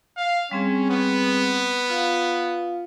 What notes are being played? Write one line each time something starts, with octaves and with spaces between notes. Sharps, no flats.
F5
G3 C4 C#4 G#4
B3
F4 F5